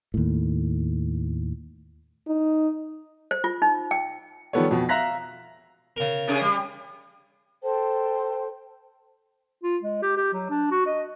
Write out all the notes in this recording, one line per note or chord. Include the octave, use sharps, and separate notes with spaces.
D#2 A2
D#4
C5
F4
D#4
G5
D#3 F3 G3 B3 A4 C#5
F2 B2
E5 F5 A#5 F#6 A#6 B6
C#3 A#4
C3 C#4 G#4
G3
A4 C5 G5 A5
F4
G#3
G4
G4
F#3
D4
F#4
D#5